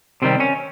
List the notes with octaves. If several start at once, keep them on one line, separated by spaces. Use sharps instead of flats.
C3 D#3 G3 C4
C#4